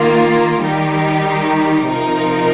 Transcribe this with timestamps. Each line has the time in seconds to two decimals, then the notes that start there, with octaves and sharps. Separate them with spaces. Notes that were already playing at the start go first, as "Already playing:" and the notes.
Already playing: D#3 A#3 F4 A#4
0.62 D#3 G3 D#4 G4
1.88 C3 F3 D#4 A#4